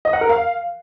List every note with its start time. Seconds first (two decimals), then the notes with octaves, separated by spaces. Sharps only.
0.05 D#5
0.13 F#5
0.21 A#4
0.29 F5